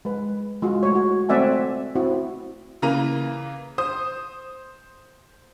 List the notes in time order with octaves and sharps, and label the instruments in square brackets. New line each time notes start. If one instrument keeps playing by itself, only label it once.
[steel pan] G#3 B4
G#3 F4 F#4
A3 C#5
F#4
A3 C4 D5 E5 F#5 G#5
C4 E4 F#4
[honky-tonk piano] C#3 E3 A#3 A#5 D#7
C5 D#6